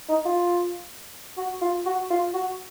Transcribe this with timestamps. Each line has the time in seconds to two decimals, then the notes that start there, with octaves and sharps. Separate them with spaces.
0.09 D#4
0.25 F4
1.37 F#4
1.61 F4
1.86 F#4
2.10 F4
2.34 F#4